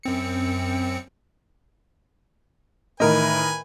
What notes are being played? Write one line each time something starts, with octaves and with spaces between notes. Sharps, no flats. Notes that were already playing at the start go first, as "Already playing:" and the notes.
F#2 C4 C#7
A2 D#3 E3 A#4 B4 D#5 G#5